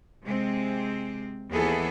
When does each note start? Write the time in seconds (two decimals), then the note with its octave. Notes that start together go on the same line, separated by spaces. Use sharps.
0.24 C3 G#3 C4
1.52 D#2 E3 B3 E4 G#4 A4